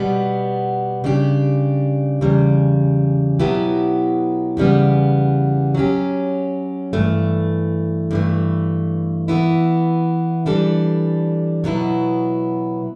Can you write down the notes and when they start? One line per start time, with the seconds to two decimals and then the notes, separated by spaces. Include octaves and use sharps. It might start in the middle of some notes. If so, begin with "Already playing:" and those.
Already playing: B2 G3 B3
1.04 C#3 G3 D4 G4
2.21 E2 C#3 G3
3.39 B2 F#3 B3 E4 G4
4.57 E2 C#3 G3 B3
5.75 F#3 C#4 G4
6.93 G2 E3 A3
8.11 G2 E3 A3
9.28 E3 B3 E4
10.46 E3 G3 D4 A4
11.64 B2 F#3 B3 E4